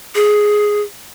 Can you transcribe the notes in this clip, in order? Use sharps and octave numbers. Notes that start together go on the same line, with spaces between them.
G#4